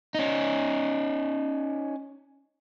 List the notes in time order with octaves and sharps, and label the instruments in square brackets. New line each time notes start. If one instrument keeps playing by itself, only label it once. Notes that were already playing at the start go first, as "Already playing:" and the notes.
[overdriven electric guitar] C#4 D#4